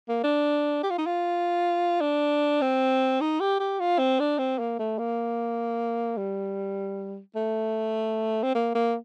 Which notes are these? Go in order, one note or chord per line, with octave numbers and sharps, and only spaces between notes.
A#3
D4
G4
F4
D#4
F4
D4
C4
D#4
G4
G4
F4
C4
D4
C4
A#3
A3
A#3
G3
A3
C4
A#3
A#3